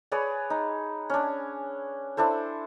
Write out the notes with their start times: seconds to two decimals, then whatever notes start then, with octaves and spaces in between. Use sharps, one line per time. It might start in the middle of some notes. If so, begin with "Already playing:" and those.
0.12 G#4 B4 C#5 D5
0.50 D#4
1.10 C#4 D4
2.17 D4 E4 A4 C5